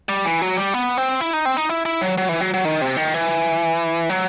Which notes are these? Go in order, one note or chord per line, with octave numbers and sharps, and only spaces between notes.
G3
E3
F#3
G3
B3
C4
E4
D#4
C4
D#4
E4
E4
F#3
F#3
E3
F#3
F#3
D#3
C3
D#3
E3
F#3